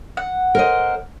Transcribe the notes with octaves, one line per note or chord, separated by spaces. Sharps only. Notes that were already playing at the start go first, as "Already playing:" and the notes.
F#5
A#4 C5 D#5